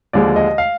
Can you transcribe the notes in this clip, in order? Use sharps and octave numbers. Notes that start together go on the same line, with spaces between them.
D#2 D3 F3 G#3 D5
D#5
F5